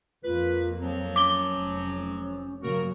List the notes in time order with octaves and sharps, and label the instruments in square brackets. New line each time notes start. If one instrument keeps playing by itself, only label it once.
[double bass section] F2 A#3 [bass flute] F4 [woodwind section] B4
[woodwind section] F3 F#3 [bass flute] C4
[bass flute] C#4 [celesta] D6 G7
[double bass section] F1
[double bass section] G2 C#3 F#3 [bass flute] A#3 [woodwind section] F#4 A#4